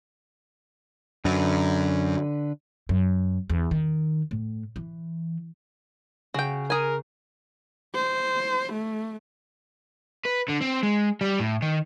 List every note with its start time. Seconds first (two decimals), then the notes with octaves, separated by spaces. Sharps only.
1.25 F#2 D3 B4
2.89 F#2
3.50 E2
3.71 D#3
4.31 A2
4.76 E3
6.34 C#3 F#4 G5
6.70 G#4 A#4 G#5
7.95 C5
8.72 A3
10.26 B4
10.49 D3
10.62 C4
10.83 G#3
11.21 G3
11.40 A2
11.62 D#3